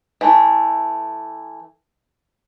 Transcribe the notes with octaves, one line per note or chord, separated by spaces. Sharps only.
E3 A3